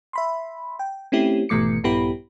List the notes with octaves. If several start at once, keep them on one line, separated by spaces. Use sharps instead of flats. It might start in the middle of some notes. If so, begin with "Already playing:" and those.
E5 B5 C6
G5
A3 C4 C#4 E4 G4
G#1 B2 E3 A3 D6 C#7
A#1 G2 B3 E4 G4 B5